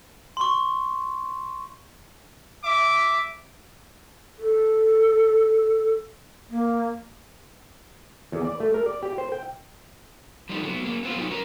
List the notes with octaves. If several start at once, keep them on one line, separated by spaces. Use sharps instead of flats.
C6 C#6
E5 D6
A4
A#3
E2
D5
A3
A#4
D5
G4
C5
G5
F3 G3 D#4
D3 F#3 B3
F#3 A#3
B3 C4 F4
F#3 D#4
C#4 A#4